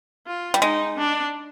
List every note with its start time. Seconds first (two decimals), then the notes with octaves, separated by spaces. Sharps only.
0.26 F4
0.54 G3
0.62 G#3 D#4
0.98 D4